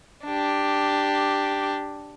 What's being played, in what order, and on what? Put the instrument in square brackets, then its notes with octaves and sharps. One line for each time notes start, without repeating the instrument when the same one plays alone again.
[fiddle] D4 G4